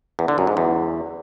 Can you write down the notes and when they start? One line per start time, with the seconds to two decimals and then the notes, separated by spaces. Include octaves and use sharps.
0.19 E2
0.28 D3
0.38 F#2
0.47 G#2
0.57 E2